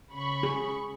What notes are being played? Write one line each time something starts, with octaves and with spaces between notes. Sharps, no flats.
C#3 B5 C#6
G#4